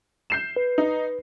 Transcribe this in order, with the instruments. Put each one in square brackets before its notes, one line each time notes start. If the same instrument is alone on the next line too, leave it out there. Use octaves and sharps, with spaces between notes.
[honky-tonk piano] G6 C7 E7
[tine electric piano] B4
[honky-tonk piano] D#4